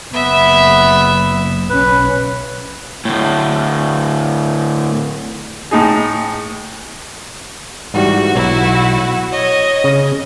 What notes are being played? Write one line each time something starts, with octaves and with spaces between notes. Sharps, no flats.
F#1 B3 E5
B1 C#4 B4
D2 A2
A2 D#4 G#4
G#2 E3 G3 F#4
B1 E4 F#4
F#5
C#5 D#5
C#3